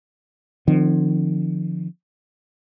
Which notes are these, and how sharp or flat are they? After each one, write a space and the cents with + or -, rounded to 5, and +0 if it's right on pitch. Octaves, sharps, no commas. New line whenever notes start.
D3 +45 F3 +0 C4 -20